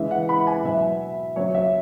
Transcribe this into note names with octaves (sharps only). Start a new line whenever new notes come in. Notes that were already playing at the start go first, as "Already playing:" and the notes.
Already playing: C#3 E3 G#3 E5
F#5
B5
G#5
B2 F#3 E5
C#3 F#3 C#5
E5